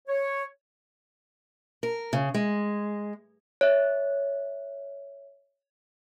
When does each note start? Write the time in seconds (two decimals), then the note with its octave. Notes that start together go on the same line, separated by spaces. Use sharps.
0.08 C#5
1.83 A#4
2.13 C#3
2.34 G#3
3.61 C#5 E5